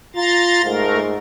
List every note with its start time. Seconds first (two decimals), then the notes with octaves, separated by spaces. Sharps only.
0.16 F4 A#5 C6 A6
0.65 G#2 A3 A#4